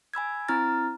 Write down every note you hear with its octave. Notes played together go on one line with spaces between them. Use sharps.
G#5 B5 E6 G#6
C4 E4 A#5 F6 A6